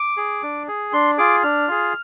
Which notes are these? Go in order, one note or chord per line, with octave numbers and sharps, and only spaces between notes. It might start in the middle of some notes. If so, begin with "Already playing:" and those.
Already playing: D6
G#4
D4
G#4
D4 C6
F4 G#4 D6
D4 F6
F4 G#4